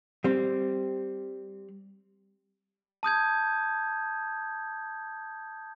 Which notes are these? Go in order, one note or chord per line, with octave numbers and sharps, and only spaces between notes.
G3 C4
A5 D#6 G6 G#6